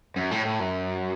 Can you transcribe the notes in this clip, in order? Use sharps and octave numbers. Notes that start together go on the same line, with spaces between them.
F#2
A2
A2
F#2